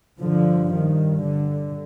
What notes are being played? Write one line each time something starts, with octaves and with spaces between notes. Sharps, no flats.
G2 D3 F3
D#3
D3